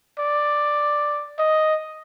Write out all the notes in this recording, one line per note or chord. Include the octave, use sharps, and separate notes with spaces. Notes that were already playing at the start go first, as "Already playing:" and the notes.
D5
D#5